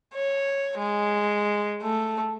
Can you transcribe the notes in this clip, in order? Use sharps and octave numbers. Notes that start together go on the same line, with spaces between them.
C#5
G#3
A3